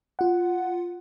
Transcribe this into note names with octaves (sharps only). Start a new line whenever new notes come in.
F4 F#5